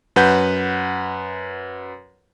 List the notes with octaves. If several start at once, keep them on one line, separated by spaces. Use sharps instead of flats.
F#2 B4 F#5 G6